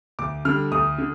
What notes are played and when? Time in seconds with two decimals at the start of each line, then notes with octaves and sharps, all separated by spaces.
0.19 D2 D6
0.45 D3 G3 F6
0.72 D2 D#6
0.98 D3